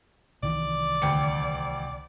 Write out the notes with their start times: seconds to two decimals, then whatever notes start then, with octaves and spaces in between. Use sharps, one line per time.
0.43 C2 D#3 E3 D5
1.02 D2 G5 C#7